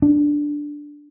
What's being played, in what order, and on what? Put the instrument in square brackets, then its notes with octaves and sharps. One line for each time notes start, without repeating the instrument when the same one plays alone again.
[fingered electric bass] D4